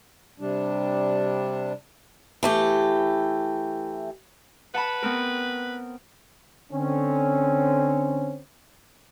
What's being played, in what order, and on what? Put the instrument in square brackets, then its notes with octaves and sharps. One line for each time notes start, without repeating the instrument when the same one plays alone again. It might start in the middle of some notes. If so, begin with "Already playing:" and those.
[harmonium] C3 G3 D4
[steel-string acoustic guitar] E3 A3 G4
[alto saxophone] B4 [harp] F#5 A5 B5
[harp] B3 C4 A#4
[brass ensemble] D3 C4 C#4